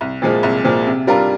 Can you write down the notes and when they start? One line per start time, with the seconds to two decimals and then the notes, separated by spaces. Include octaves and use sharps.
0.01 C2
0.22 A#2 F3 G#3
0.43 C2
0.64 A#2 F3 G#3
0.87 C3
1.07 G3 D4 F4 A#4